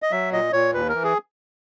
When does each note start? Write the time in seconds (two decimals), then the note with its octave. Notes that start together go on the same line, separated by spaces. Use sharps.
0.02 D#5
0.11 F#3 E5
0.33 A#2 D#5
0.53 A#2 C#5
0.74 D#2 B4
0.89 E3 A#4
1.04 G#4